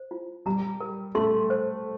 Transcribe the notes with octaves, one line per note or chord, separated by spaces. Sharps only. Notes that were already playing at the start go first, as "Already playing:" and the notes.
Already playing: C5
F4
G3 A#5
A#4
A3 C6
C5